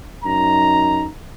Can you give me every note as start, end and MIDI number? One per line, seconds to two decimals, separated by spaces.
0.25 1.07 42
0.25 1.07 63
0.25 1.07 82